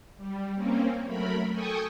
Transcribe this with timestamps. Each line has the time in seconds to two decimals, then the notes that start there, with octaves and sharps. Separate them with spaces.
0.17 G3
0.55 A#3 C4 C#4
1.04 F#3 A3 A#4 B5
1.50 A4 G5 G#5 C#6 D#6